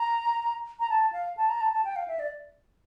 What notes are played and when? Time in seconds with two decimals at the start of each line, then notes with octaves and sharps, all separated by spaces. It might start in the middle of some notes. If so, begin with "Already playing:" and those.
Already playing: A#5
0.80 A#5
0.90 A5
1.13 F5
1.37 A5
1.49 A#5
1.61 A5
1.73 A5
1.84 G5
1.96 F5
2.08 E5
2.19 D5